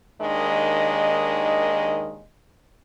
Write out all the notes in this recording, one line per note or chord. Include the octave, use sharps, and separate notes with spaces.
D#2 D#3 G#3 D4 D#5